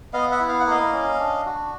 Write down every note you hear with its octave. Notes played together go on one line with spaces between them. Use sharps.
B3 D#5 F5
E5 F#5
E4
F5
F#5
A#3 D#5 F5
C#4
D4
F#4